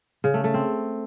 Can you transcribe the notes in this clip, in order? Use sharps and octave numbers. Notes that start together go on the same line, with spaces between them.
C#3
A3
A3
C4